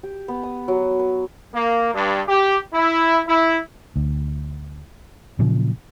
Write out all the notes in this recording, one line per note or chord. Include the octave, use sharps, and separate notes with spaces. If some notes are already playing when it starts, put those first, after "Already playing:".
G4
B3
D#6
F#3
B4
A#3
G2
G4
E4
E4
D2
A#2 C#3 F3 F#3